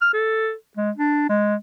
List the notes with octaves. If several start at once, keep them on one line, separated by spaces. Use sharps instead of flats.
F6
A4
G#3
D4
G#3